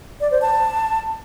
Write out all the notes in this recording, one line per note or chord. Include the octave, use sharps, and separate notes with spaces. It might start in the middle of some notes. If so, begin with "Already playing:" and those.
D5
C5
A5